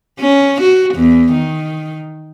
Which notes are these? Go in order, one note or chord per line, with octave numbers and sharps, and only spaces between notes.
C#4
F#4
E2
D#3